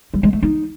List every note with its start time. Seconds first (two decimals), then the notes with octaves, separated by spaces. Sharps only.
0.14 G3
0.23 G#3
0.33 A3
0.43 D#4